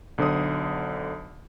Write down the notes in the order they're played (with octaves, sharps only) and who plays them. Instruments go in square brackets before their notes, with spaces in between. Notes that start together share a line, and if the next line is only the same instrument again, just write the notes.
[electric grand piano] B1 D3 C5 D#6